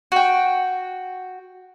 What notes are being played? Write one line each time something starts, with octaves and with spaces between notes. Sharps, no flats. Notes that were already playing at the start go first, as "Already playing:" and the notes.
F#4 G5